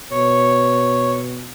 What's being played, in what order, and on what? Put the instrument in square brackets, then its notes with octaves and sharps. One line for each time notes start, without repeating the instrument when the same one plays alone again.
[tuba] B2 [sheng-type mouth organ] C#5